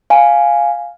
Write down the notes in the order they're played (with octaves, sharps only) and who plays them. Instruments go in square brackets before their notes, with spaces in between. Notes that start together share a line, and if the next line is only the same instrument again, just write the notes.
[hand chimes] F5 G#5